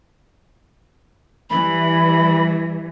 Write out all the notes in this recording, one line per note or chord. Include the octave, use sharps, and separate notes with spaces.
E3 G3 B5